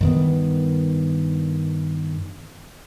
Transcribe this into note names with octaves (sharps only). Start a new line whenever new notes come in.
G2 D#3 B3